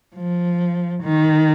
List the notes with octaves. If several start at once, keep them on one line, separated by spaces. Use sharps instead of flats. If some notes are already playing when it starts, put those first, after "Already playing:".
F3
D#3